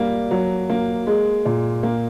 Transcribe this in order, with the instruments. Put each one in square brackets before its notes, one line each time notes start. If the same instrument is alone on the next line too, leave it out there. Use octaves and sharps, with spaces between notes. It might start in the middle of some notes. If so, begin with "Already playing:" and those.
Already playing: [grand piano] G3 A#3
F#3
A#3
G#3
A#2
A#3